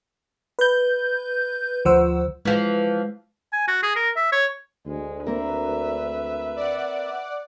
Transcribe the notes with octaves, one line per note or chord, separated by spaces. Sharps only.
B4 G6
D2 F3 C5 F#5 E6
E3 F3 G#3
G#5
F#4
G#4
A#4
E5
C#5
D2 G#3
A#3 C4 A#4 B4 E5
D5 F#5